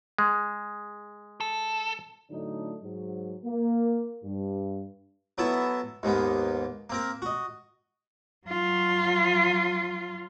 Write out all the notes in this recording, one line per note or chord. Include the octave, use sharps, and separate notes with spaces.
G#3
A4
A2 D3 F#3 A3 D4 D#4
G#2 F#3
A#3
G2
F#3 B3 E4 A4 E5
D#2 G#2 A#3 B3
A#3 C4 A#4
F#4 D#5
F#3 F4